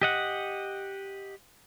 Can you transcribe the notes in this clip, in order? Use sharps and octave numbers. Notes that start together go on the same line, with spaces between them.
G4 D#5 F#5